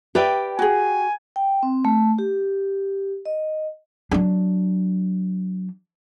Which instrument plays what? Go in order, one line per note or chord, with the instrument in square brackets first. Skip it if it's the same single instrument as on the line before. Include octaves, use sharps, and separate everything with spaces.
[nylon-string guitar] G4 G5 [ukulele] B4 D5 E5
[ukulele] F#4 G#4 [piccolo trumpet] G#5
[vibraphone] G5
C4
A3
G4
D#5
[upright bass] F#3 D4